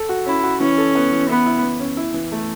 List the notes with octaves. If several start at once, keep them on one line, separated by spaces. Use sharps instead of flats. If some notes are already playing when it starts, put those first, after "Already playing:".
Already playing: A4
F#4
C#4 E4
F#4
E3 C#4
A4
B3
E3
B3 E4
E4
E3
C#4
E4
E3
A3